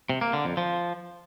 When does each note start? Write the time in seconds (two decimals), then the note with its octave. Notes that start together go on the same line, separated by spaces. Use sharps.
0.09 C3
0.21 A#3
0.33 D3
0.45 F2
0.57 F3